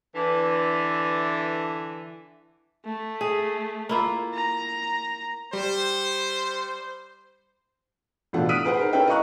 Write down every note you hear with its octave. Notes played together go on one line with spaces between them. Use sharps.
D3 E3
A3
G#4
A#3 E4 F4
A#5
G3 C5
A1 B2 D4 F4 A4 F#5
D#6 F6 F#6 B6 D7 D#7
G#4 B4 C5 F#5
D#4 A#4 C5
C#4 E4 A4 B4 E5 G5
D#5 F5 A#5 C#6 F#6